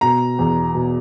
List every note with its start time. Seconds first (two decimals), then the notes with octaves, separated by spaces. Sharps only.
0.01 B2 A#5
0.39 E2
0.75 B2